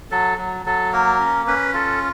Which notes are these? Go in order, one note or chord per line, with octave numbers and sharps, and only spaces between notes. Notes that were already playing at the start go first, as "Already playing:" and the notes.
F#3 A4
F#3
F#3 A4
A#3 A#4
C#4
C#4 B4
F4 A4